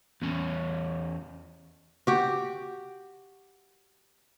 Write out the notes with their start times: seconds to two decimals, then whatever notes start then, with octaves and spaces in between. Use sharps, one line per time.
0.22 E2 C#4
2.07 F#4 G4